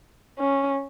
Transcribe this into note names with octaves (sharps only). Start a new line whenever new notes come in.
C#4